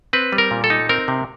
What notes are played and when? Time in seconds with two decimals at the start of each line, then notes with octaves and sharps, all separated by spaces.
0.13 C4 B4
0.33 G3
0.38 A#4
0.51 A#2
0.64 A4
0.70 D#4
0.89 C4 A#4
1.08 C3